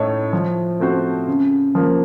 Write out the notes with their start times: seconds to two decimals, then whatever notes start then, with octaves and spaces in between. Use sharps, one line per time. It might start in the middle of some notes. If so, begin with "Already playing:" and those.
Already playing: A2 A3 D#4 A4 C#5
0.33 F3
0.80 A3 C4 F#4 C5
1.27 C#3
1.75 F3 A#3